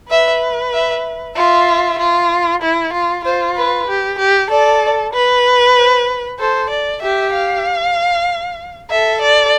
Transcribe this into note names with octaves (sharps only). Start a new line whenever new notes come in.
B4 E5
E5
F4 E5
F4
E4
F4
F4 C5
B4
G4
G4
A4 D5
B4
C5
A4 C5
D5
G4 E5
F5
A4 E5
D5